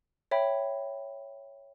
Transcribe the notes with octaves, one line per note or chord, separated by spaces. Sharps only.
C#5 E5 G5 B5